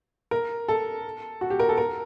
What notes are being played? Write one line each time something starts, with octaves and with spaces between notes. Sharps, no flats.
A#4
A4
F#4
G4
A#4
A4
A#4